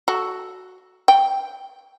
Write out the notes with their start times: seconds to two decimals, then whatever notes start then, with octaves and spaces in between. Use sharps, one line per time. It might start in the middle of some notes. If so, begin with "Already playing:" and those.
0.08 F#4 A4
1.08 G5